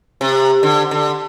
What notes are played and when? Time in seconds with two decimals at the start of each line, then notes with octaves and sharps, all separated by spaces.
0.21 C3
0.63 D3
0.91 D3